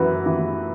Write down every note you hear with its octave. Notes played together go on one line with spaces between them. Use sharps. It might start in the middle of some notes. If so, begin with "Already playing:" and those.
Already playing: F#2 E3 F#4 B4
E3